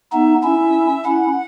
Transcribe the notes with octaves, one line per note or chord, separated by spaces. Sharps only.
B3 D#4 E5
C#4 E4 E5
C#4 E4 F#5